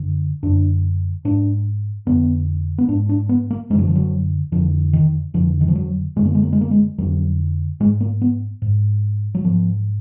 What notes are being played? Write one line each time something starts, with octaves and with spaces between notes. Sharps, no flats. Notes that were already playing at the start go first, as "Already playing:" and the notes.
Already playing: F#2 D3
F#2 D3 D4
G#2 D4
F2 D3 B3
B3
G#2 D4
D4
B3
A#3
F#2 D3 F#3 G#3
F3
F#3
F2 D3 F3
D#3
F2 D3 F3
D#3
F3
F#3
F#2 D3 G#3
A#3
G#3
A#3
G#3
A#3
G#3
F2 D3 F#3
G#2 G#3
A#3
B3
G#2
F#3
G#2 F3